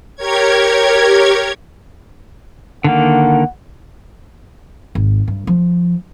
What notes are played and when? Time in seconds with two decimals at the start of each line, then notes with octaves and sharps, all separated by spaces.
0.15 G4 A#4 C#5 G#6
2.84 D3 D#3 A#3 F#5
4.95 G#1
5.28 G2
5.47 F3